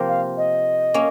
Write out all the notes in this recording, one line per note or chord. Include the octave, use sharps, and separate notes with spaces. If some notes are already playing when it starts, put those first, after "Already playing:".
Already playing: C3 F3 A#3 F4 C5
F5
D#5
A#3 C#4